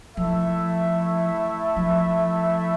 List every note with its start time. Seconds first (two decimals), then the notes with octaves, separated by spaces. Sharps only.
0.16 F3 A3 E4 A4 E5
1.76 F3